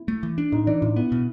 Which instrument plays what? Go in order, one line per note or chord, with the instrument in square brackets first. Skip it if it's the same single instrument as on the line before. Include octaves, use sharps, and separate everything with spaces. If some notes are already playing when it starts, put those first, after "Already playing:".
Already playing: [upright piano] E4
[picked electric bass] A3
E3
D4
[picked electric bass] A2 [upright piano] D#4
[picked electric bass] E3 [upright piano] D4
[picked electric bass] A2 [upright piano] E4
[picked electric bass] B3 [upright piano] E4
[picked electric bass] B2